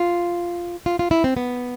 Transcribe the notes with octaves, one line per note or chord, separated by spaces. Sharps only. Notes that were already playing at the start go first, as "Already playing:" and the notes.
Already playing: F4
F4
F4
E4
C4
B3